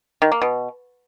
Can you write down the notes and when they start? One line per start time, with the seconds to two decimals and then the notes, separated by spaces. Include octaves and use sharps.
0.22 D#3
0.32 A#3
0.42 B2